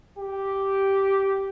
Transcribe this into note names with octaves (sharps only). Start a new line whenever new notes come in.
G4